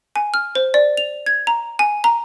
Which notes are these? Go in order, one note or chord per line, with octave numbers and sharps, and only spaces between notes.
G#5
F6
C5
D5
F7
G#6
A#5
G#5
A#5